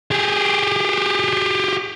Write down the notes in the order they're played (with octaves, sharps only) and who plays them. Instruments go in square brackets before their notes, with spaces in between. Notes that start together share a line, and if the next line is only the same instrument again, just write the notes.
[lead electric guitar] G4 G#4